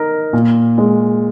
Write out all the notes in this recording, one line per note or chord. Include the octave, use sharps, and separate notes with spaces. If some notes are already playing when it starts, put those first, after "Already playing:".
Already playing: D#4 A#4
A#2
G#3